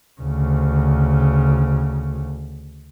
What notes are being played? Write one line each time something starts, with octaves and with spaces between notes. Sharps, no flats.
D2 C#3